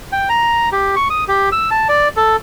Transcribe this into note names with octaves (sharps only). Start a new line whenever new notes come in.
G5
A#5
G4
C#6
D#6
G4
E6
A5
D5
A4